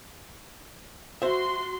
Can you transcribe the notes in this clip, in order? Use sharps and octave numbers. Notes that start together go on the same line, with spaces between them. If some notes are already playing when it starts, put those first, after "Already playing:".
F#4 C5 E5 C6